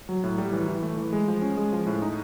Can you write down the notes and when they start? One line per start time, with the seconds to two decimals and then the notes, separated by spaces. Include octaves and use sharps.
0.09 F#3
0.24 A2
0.38 G3
0.52 E3
0.68 E3
0.83 A3
0.97 E3
1.13 G#3
1.28 F3
1.42 C#4
1.57 G#3
1.73 F3
1.86 A2
2.02 D#4